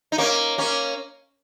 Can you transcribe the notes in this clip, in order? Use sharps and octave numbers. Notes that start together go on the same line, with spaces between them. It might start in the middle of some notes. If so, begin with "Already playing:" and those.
D#4
A#3 C#4
A#3 C#4